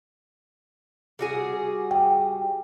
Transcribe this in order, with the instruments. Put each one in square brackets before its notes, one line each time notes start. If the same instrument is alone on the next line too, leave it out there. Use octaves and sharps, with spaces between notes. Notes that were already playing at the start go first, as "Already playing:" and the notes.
[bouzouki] G3 F#4 G#4
[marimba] G5